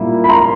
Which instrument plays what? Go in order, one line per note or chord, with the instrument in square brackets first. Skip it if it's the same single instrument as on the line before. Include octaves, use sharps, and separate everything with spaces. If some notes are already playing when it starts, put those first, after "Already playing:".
Already playing: [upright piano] A#2 G3 A#3 E4
B5
A#5 C6